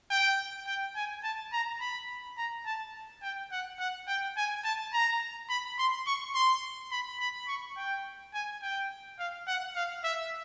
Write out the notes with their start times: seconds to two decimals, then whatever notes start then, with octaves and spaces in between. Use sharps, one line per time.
0.10 G5
0.66 G5
0.96 G#5
1.24 A5
1.53 A#5
1.81 B5
2.37 A#5
2.66 A5
3.22 G5
3.52 F#5
3.79 F#5
4.08 G5
4.37 G#5
4.64 A5
4.93 A#5
5.49 B5
5.79 C6
6.07 C#6
6.35 C6
6.91 B5
7.20 B5
7.48 C#6
7.77 G5
8.34 G#5
8.62 G5
9.19 F5
9.47 F#5
9.75 F5
10.04 E5